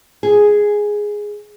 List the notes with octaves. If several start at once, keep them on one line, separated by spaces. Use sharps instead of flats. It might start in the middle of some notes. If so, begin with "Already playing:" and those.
G#4